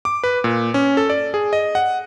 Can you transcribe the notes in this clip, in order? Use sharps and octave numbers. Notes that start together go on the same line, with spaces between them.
D6
B4
A#2
C#4
A4
D5
G#4
D#5
F#5